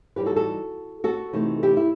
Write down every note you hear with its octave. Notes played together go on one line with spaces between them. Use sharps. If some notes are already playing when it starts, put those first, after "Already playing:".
E3 G3 D#4 G4 B4
F#4 A4
F#4 A4
F#4 A4
C3 E3 A3 D#4
E4 G4
E4